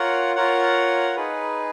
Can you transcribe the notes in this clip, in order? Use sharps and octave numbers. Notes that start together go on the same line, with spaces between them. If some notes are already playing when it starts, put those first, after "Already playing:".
Already playing: F4 A#4 C#5 F#5
F4 A#4 C#5 F#5
D#4 G#4 B4